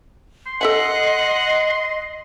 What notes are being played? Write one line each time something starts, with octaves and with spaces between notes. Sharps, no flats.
C6
A4 D#5 E5 F#5 G#5